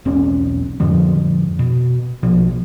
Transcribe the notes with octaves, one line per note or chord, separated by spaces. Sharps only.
E1 B1 C4 C#4
F2 A2 D3 F3
B2
A#1 B2 F3